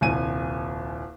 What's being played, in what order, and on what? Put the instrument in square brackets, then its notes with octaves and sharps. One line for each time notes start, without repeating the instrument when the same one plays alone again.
[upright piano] D#1 C2 G#5 D#7